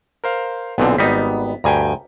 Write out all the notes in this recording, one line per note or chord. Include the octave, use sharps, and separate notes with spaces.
A#4 C5 F5
B1 A#2 D3 B3 C4
G#1 G3 B3 D#4 B6
D2 G2 G5 G#5 A#5